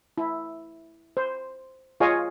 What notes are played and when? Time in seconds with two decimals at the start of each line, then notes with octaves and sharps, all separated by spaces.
0.18 E4
1.17 C5
2.00 F4 G#4 C#5 D#5 F5 G#5